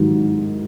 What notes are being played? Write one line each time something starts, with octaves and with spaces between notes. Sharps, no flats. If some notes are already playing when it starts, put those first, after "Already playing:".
Already playing: G#2 D#3 F#3